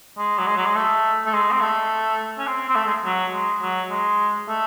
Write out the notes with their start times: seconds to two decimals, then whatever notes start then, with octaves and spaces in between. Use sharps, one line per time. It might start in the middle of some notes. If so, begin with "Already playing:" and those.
0.18 G#3
0.38 F#3
0.47 G#3
0.57 F#3
0.66 G#3
0.76 A3
1.26 A3
1.33 G#3
1.51 C4
1.61 A3
2.38 C#4
2.47 C4
2.69 C4
2.76 A3
2.86 G#3
3.05 F#3
3.33 G#3
3.61 F#3
3.91 G#3
4.48 A3